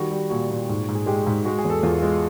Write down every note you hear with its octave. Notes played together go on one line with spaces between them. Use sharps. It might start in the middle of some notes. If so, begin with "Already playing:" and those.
Already playing: D#3 G3 F#4
G3
A#2 F#4
A#2
G#2
G#2
G#4
G#3 G4
G#2
G#3 F#4
G#4
E2
A4
E2 F4
G#3 F4